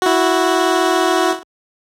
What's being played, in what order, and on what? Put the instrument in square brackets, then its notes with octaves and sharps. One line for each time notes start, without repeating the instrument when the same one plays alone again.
[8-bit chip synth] E4 F#4